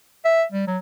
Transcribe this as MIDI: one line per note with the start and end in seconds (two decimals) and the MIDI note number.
0.25 0.44 76
0.52 0.67 55
0.67 0.78 54